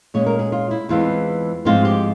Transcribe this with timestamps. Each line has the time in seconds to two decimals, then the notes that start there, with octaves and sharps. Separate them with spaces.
0.14 A#2 G#3 C#4 C#5
0.26 A#4
0.39 G#4
0.52 F4
0.71 E4
0.89 E2 E3 G#3 C4 F4
1.65 G#2 F3 G#3 C4 F4
1.85 G4